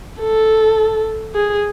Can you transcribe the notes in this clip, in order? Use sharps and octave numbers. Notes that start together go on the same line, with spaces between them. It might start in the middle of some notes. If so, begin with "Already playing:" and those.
A4
G#4